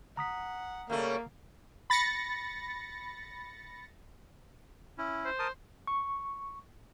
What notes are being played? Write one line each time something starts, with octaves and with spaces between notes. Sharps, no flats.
F#5 A#5 D#6 B6
C#3 G3 A3 A#3 F5
B5 A6 A#6 C#7
C#4 E4
C5
A#4 A5 D#6
C#6